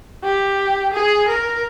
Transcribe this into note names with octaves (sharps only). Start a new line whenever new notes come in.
G4
G#4
A#4